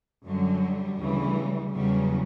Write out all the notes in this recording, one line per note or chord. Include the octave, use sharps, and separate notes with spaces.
F#2 D3 F#3 G3
D2 C#3 E3
E2 C#3 F#3 G3